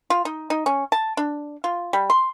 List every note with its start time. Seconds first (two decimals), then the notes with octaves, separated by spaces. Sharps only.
0.10 F4
0.25 D#4
0.50 D#4
0.66 C#4
0.92 A5
1.17 D4
1.64 F4
1.93 G3
2.10 C6